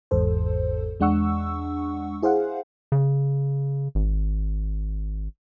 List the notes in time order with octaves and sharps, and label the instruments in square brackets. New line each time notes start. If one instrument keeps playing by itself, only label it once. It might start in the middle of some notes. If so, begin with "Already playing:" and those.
[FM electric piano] G#1 E2 G#2 A4 C5
E2 G#3 D4 F#5 C#6 E6
E4 G#4 C5 F5 F#5
[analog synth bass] C#3
G#1